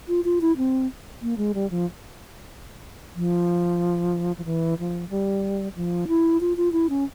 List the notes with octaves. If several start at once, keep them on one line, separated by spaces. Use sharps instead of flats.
F4
F4
E4
C4
A#3
G#3
G3
F3
F3
F3
E3
F3
G3
F3
E4
F4
F4
E4
C#4